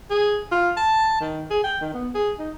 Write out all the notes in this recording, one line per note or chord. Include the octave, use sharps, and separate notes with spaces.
G#4
F4
A5
D#3
G#4
G5
D#3
B3
G#4
D#4